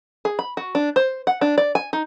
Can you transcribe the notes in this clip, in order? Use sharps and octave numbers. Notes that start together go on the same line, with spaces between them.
G#4
B5
F#4
D4
C5
F#5
D4
D5
G#5
D#4